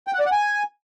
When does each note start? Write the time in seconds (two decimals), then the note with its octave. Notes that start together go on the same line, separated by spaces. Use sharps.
0.07 G5
0.14 F#5
0.20 D5
0.26 F#5
0.32 G#5